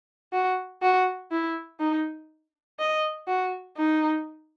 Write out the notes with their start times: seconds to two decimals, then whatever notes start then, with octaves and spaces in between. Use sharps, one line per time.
0.33 F#4
0.82 F#4
1.32 E4
1.80 D#4
2.79 D#5
3.27 F#4
3.77 D#4